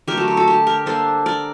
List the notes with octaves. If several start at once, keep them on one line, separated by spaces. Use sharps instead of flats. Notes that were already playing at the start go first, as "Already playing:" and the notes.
D3 F#3 A3 G4 A#4
F#4 A4
G4
F#4 A4
G4
G4 A#4
G3 A#3 D4 A4 C5
A#4 D5